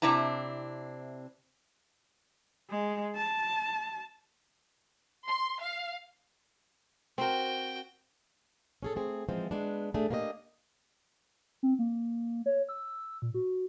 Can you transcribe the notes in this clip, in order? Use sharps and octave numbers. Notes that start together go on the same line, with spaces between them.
C3 C4 D4 E4 A#5
G#3
A5
C6
F5
C4 F#4 A#4 G5
C#4 G#4 A4
A3 C4 G#4
E3 F3 G#3 C4
G#3 B3 D4
A3 D4 G#4
A#3 D4 G4 B4 D#5
C4
A#3
C#5
E6
A#2
F#4